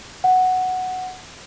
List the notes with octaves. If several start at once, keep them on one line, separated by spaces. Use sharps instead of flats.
F#5